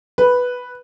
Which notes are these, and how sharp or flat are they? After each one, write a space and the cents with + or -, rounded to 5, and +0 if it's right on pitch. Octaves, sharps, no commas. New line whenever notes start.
B4 +0